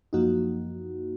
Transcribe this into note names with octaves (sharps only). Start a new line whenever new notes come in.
F#2 F3 A#3 D#4 F#4